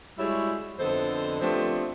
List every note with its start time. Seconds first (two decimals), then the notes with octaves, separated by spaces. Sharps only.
0.19 G3 G#3 E4 F#4 C#5
0.78 F2 D3 B3 A4 C5 D#5
1.41 F3 A3 B3 C4 D4 G4